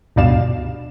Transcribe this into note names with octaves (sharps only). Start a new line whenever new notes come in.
D2 G2 B2 D5 F5 E7